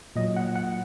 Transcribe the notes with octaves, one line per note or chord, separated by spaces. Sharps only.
A#2 F#3 D#5
F#5
F#5